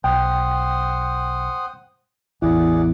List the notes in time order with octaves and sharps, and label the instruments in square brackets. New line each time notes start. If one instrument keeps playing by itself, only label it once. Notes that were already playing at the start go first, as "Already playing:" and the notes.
[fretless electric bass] B1 [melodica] C5 F#5 D#6 [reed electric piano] G5
[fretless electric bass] A1 E2 [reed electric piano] E4 [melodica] G#4 D5 F#5